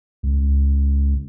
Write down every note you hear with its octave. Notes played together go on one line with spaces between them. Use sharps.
C#2